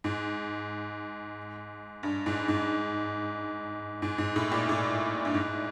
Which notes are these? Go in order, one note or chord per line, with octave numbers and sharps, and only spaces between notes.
G#2
G2
G#2
G#2
G#2
G#2
A2
A#2
A2
G2
G#2